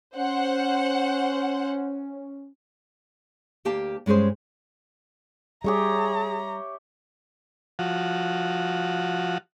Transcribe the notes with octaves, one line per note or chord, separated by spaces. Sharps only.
C#4 C5 F#5
D2 A#3 G4 F5 A5
G2 G#3 C#4 G#4 C5
G3 G4 G#4 C#5 E5 A#5
F3 F#4